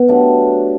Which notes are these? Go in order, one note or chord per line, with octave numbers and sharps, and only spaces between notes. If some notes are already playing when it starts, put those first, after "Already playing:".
Already playing: B3
F#3 A3 D4 G4